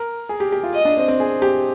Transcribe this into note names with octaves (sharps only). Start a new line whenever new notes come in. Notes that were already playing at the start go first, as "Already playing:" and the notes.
Already playing: A#4
G#4
G4
G4
F4
D#5
D4
C4
C4
G#4
G4